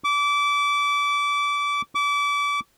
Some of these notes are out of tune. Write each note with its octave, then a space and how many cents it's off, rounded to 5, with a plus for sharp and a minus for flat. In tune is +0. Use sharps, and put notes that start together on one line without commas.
D6 -25
D6 -30